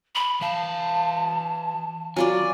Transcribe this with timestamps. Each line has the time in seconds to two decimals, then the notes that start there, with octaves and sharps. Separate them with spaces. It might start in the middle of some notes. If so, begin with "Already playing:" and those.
0.15 B5
0.41 E3 F5 A5
2.16 F#3 F4 D5 G#5